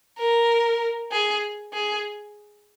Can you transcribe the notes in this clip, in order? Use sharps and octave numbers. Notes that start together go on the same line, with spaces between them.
A#4
G#4
G#4